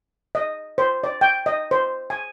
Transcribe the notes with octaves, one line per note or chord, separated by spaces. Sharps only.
D#5
C5
D5
G5
D#5
C5
G#5